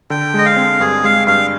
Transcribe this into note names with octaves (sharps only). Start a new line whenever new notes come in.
D3 G5
G#3 D#5
F5
C4
G2 G#4
G#3 F5
G2 F5